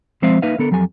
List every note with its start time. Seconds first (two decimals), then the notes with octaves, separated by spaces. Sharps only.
0.22 F3 G#3 C4 C5 E5 F5
0.42 A#3 D#4 B4 E5 F5
0.58 D3 B3 A4 A#4
0.71 F2 F#3 G4 A4 G#5